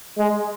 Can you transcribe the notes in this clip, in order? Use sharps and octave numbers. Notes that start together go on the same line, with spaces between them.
G#3